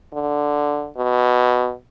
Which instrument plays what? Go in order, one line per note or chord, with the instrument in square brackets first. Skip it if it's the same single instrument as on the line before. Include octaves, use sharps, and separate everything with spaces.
[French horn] D3
B2